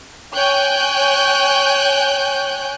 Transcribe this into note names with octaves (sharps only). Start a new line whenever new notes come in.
C#5 G5 G#5 F#6 G6